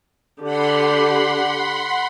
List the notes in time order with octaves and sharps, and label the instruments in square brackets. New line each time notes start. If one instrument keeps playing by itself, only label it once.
[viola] D3 G4 [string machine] F#5 B5 C6